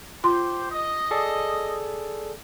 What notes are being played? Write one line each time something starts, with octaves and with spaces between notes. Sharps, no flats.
F4 G4 C5 C6
D#5
G#4 A4 D5